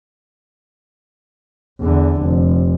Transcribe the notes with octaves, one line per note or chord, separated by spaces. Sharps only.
E2 D3
F1